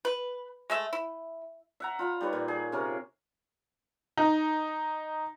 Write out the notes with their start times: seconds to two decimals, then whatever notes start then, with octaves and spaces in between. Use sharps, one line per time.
0.05 B4
0.70 G#3 A3 E5
0.93 E4
1.80 E5 F#5 A#5
1.99 F4 A#5 B5
2.21 G3 D#4 B4 C#5
2.33 A#2
2.48 G#4
2.72 C3 C#4 A#4
4.17 D#4